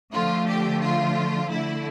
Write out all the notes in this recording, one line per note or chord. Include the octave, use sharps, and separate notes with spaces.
D3 F3 A3 F4
G4
F4
D3 A3 E4